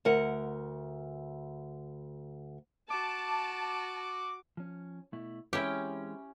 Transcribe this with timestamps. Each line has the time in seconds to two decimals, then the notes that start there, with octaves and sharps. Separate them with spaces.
0.05 D2 A#4 F#5
2.90 F#4 A5 D6
4.57 F3 C#4
5.13 B2 A3 E4
5.53 E3 G#3 C4 C#4 E4 G4 G5